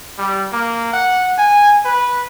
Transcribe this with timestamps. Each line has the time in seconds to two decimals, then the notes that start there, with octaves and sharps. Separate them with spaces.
0.18 G3
0.52 A#3
0.93 F#5
1.38 G#5
1.85 B4